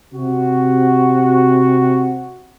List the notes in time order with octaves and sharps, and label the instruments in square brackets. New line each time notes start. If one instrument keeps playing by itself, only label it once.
[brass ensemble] C3 F#4